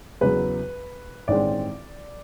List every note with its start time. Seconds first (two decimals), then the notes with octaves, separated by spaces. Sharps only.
0.21 E2 C#3 F#3 B4
1.28 A1 G2 D#3 G#3 C4 D5